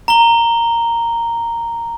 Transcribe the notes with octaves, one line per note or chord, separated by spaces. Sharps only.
A#5 G7